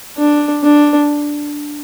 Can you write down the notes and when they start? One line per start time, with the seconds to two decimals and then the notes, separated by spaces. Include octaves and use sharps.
0.18 D4
0.63 D4